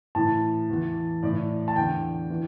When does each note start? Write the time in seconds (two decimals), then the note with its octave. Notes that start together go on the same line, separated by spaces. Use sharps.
0.15 A2 E3 A5
0.69 E2 E3
1.23 A2 E3 D5
1.68 A5
1.76 E2 D3 G5
2.30 E3